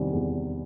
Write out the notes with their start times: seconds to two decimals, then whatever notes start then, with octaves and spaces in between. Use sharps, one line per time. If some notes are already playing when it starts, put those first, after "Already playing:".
Already playing: E2 C3 D#3 G3 C4
0.13 E2